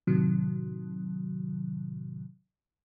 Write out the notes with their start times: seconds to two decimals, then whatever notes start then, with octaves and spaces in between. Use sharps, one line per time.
0.07 A2 C3 D#3 F#3